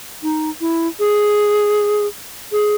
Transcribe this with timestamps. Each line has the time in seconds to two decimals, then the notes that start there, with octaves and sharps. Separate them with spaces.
0.23 D#4
0.61 E4
1.00 G#4
2.52 G#4